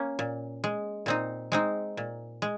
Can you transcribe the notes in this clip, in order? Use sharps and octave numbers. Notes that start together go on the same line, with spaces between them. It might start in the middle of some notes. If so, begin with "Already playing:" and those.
Already playing: A#3 C#4
A#2
G#3
A#2 C4 D#4
G#3 C4 D#4
A#2
G#3